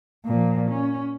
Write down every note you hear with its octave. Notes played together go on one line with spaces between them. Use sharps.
A#2 F3
C#4